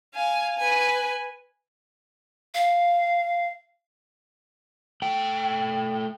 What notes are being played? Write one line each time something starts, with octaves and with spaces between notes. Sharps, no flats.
F5 G#5
B4 G#5
F5
A3 G5